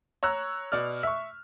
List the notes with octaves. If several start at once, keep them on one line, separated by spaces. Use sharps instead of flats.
C#5 A#5 E6 F#6
B2 D5 F6
E5 C#6